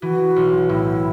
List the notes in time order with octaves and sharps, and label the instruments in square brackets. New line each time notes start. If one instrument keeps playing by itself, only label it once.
[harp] E3 [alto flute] F#4
[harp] B1
[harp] A2 [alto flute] E4